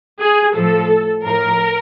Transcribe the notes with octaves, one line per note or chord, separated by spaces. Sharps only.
G#4
A2 F3 A4
A2 F3 A#4